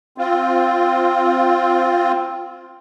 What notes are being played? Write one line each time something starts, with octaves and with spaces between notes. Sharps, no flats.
C4 F4